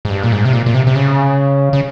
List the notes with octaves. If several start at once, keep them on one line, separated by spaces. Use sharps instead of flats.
G#2
G2
A#2
G#2
C3
A#2
A#2
C3
C3
C#3
C#3